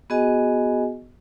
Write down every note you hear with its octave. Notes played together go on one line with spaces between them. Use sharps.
B3 F#4 G#4 D#5 G#5